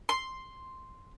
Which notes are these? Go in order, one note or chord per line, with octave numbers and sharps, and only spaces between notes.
C6